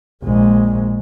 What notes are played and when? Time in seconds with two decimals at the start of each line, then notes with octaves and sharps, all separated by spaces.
0.24 A#1 G#3